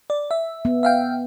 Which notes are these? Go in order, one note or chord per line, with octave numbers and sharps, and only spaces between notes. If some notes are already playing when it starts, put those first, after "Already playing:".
D5
E5
B3
E5 F5 G5